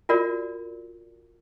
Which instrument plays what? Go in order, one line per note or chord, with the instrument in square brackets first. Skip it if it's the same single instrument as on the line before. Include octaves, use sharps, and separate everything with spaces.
[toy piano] F4 F#4 A#4 D5